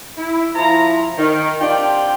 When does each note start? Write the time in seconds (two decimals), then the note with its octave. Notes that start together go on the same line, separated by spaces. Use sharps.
0.18 E4
0.55 F3 E4 F4 A#5
1.18 D#3
1.61 C4 D4 F4 G4 D5 G5